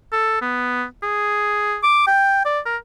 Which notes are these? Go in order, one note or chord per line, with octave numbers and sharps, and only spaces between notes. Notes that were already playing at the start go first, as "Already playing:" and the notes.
A4
B3
G#4
D6
G5
D5
A#4